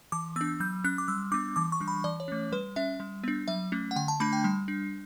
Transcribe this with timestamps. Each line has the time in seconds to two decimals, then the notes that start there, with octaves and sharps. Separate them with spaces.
0.12 E3 D6
0.36 B3 E6
0.41 D4
0.60 F#3 G6
0.84 C#4 F#6
0.98 D6
1.08 G3 E6
1.32 B3 D4 D6
1.56 E3 D6
1.72 C#6
1.80 G3 D4
1.88 B5
2.04 E3 D5
2.20 C#5
2.28 A3 C#4
2.52 G3 B4
2.76 C#4 E5
3.00 G3
3.24 B3 D4
3.48 F#3 E5
3.72 A3 C#4
3.91 F#5
3.96 D3 G5
4.08 A5
4.20 A3 D4 B5
4.33 G5
4.44 G3
4.68 D4